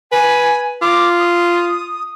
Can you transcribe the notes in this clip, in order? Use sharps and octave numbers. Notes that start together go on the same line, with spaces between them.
B4 G#5
F4 D6
D#6